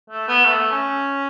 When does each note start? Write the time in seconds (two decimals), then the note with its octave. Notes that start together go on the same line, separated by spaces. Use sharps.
0.10 A3
0.28 B3
0.45 A3
0.72 C#4